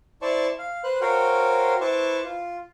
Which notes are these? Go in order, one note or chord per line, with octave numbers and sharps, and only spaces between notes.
E4 C5 D5 A5 C#6
F5
B4 C5 F#6
F#4 A#4 C5 C#5 F5 G5
E4 B4 C5 A5 C#6 D6
F4